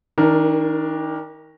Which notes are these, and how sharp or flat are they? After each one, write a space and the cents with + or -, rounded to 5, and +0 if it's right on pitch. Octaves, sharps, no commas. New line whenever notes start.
D#3 +35 D4 +0 A#4 +0